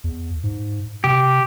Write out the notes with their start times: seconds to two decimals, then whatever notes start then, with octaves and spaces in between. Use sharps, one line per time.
0.04 E2
0.43 G#2
1.04 C3 G4